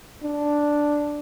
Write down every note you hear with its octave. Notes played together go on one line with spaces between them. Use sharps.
D4